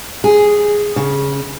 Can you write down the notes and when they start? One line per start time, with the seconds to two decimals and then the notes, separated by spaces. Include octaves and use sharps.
0.24 G#4
0.96 C#3